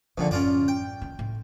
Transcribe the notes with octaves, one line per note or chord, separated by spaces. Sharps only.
A#1 A#2 D3 C4
A1 F#2 C#4 F4 D5
G5
D#3
A2